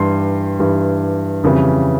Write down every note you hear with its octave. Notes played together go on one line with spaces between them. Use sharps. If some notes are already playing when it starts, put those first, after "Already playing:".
Already playing: G2 E3 G3 C6
G2 E3 G3
F2 C#3 E3 G3